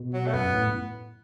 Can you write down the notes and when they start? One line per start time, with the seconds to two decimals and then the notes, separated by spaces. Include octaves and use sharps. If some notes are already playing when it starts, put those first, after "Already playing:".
Already playing: B2
0.14 F#3
0.26 A3
0.33 F#2 B3
0.53 A2